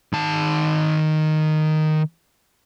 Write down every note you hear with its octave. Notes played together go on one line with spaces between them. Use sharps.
D#3 A5